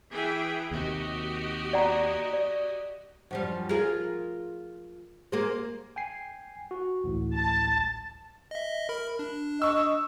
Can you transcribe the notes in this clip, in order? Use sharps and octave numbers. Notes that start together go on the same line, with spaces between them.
E3 G#4 G5
D#2 C3 F#4 G4 D#5
D5 F#5 A#5
D5
F#2 F3 G3
F4 G#4 A#4
A#3 G#4 C5
G5 G#5 C7
F#4
A1 D2 A2
A5
D#5 E5
A#4 B5
D4
D#5 C#6 E6